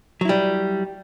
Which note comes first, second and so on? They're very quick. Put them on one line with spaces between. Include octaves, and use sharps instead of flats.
F#3 E4 G3